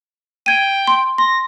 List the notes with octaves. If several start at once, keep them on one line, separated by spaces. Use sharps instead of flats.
G5 G#6 D#7
C6
C6 A#6